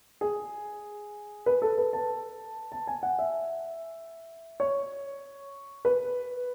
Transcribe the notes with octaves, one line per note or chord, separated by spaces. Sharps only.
G#4
B4
A4
B4
A5
A5
G#5
F#5
E5
C#5
B4